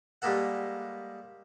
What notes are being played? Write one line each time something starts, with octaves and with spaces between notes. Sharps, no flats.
G3 G#3 A#3 A4 F#5